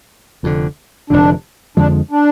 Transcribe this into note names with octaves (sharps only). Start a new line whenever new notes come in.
F1 F2 D3
F1 F2 D3 D4
F2 D3 F3 G#3 D4
D4